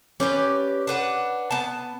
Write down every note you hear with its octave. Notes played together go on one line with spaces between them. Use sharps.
C#4 G4 B4 D5
D4 B4 F#5
B3 A5